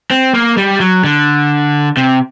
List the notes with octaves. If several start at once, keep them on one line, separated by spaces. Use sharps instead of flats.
C4
A#3
G3
F#3
D3
C3